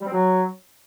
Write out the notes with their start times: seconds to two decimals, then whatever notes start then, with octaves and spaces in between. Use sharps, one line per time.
0.01 G3
0.07 C4
0.12 F#3